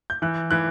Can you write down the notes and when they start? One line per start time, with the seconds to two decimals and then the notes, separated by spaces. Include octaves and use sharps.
0.10 G6
0.22 E3 F#6
0.51 E3 F#6